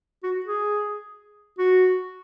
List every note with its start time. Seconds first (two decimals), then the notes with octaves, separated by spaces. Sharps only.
0.23 F#4
0.46 G#4
1.58 F#4